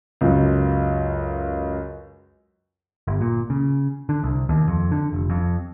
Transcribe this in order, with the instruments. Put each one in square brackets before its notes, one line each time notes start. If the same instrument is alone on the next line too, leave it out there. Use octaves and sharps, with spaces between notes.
[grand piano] C#2 F#2
[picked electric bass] G1
A#2
C#3
D3
C2
D#2
F2
D3
F1
F2